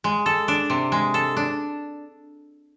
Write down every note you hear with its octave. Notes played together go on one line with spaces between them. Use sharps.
G#3
A4
D4
C3
G#3
A4
D4